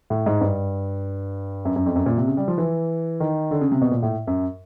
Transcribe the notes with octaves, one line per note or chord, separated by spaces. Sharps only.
A2
G#2
G2
F#2
F#2
F2
F#2
A#2
C3
C#3
G3
F3
E3
D#3
D3
C#3
C3
B2
A#2
A2
F#2